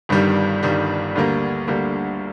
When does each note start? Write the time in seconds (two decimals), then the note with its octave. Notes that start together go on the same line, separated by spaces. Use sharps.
0.09 G1 G2 D#3 G3
0.63 G1 G2 D#3 G3
1.16 D2 D3 G3 A#3
1.67 D2 D3 G3 A#3